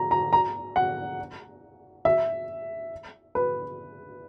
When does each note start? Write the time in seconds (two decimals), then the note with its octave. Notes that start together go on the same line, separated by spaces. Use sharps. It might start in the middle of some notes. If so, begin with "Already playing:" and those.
Already playing: A#5
0.11 A#5
0.33 A#5
0.76 F#5
2.05 E5
3.35 B4